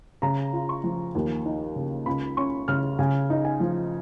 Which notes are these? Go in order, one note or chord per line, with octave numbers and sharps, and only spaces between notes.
C#3 A#5
F4
C#6
F3
D#2
D#4
C#3
C#2 B5
C#4 C#6
C#3 F6
C#3 G#5
D#4
G#5
F3